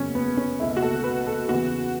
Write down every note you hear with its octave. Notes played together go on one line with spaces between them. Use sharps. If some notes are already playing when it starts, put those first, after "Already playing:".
Already playing: F#1 E2 C#3 F#3 C#4
B3
C#4
C#2 B2 A3 E4
F#4
A4
B4
A4
E2 C#3 E3 F#4